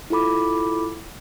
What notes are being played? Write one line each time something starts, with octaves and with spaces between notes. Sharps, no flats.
E4 F4 A4 B5 D6